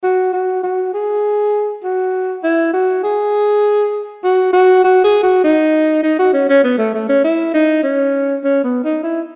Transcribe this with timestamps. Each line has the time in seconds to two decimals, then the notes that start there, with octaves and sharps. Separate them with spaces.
0.03 F#4
0.33 F#4
0.63 F#4
0.94 G#4
1.84 F#4
2.44 E4
2.73 F#4
3.04 G#4
4.24 F#4
4.53 F#4
4.84 F#4
5.04 G#4
5.23 F#4
5.44 D#4
6.03 D#4
6.19 F#4
6.33 C#4
6.49 C#4
6.64 B3
6.78 A3
6.94 A3
7.09 C#4
7.24 E4
7.54 D#4
7.83 C#4
8.44 C#4
8.64 B3
8.84 D#4
9.03 E4